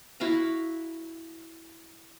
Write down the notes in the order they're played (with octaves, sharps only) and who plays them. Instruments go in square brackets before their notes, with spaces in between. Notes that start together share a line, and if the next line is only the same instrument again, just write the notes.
[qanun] E4 F#4 F5 A#5